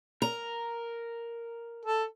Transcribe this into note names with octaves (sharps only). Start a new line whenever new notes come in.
A#4 A#5
A4